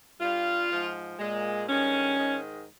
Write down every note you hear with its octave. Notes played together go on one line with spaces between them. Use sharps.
G2 G3 F4
G#2 F3 G#3
A#2 G#3
G2 D#3 G#3 C#4
G#2 D#3 G#3